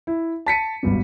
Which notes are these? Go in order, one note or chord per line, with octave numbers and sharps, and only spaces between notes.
E4
A5 B6 C#7 D#7
G#1 G2 B2